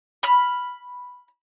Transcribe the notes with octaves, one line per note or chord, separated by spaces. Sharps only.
B5 F6